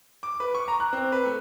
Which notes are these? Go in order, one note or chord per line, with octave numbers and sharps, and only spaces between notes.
D6
B4
C#6
A#5
F#6
C4
B4
A3